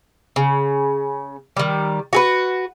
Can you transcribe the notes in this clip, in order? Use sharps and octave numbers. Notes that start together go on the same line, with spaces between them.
C#3
D#3 G3
F#4 G#4 B4